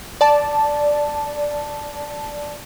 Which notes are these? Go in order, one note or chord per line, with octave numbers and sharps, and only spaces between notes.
D5 A5